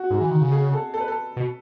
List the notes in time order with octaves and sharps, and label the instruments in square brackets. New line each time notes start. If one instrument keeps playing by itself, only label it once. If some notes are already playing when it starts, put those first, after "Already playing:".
Already playing: [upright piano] F#4
[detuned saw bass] G#2
E3
D#3
C#3
[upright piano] G#4
A4
A4
B4
A4
[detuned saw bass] B2